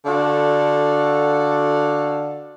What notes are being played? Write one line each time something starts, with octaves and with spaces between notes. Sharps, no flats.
D3 F#4 A4 D5 F5